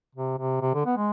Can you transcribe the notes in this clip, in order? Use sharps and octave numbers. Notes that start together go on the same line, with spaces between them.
C3
C3
C3
D3
B3
G#3